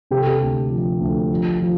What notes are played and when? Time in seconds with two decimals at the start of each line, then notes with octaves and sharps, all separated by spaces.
0.11 C3 G4
0.19 A4
0.27 G4
0.41 D2
0.70 F3
1.00 D2
1.31 F3
1.61 F3